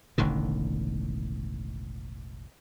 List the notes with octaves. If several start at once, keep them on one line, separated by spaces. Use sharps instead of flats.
E1 A1 D3 D#3